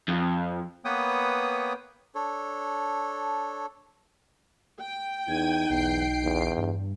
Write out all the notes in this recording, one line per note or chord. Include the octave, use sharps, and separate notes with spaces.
F2
A#3 B3 B4 C#5 G5 D#6
D4 A4 C#5
G5
E2 D#4 G#6 D#7
B1 E2 C7 D7
E2
G2